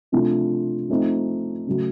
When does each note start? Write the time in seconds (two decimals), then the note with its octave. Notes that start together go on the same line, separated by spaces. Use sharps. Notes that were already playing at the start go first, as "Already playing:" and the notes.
0.12 C3 F3 A3 D4 F4
0.89 F3 A3 C4 D#4
1.67 C#3 F#3 A3